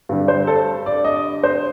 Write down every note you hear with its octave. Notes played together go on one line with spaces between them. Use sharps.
G2 D3 G3
C5
A4
D5
D#5
C5